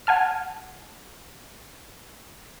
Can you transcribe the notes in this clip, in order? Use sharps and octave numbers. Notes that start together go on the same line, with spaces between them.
F#5 G#5 A5 F6